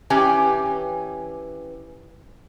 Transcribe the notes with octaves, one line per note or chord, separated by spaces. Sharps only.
E3 C#4 G4 B4 G5 G#5